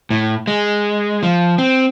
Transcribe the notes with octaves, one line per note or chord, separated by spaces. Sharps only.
A2
G#3
F3
C4